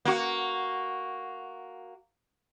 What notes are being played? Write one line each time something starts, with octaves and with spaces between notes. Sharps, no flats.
A#3 F#4